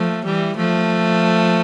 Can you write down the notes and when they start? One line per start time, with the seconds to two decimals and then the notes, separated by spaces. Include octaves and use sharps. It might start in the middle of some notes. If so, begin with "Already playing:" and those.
Already playing: F3 A3
0.25 E3 G3
0.57 F3 A3